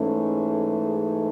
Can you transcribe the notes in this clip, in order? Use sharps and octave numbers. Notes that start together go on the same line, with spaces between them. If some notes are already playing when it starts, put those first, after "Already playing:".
Already playing: G#2 E3 A3 C#4
G#4
G#4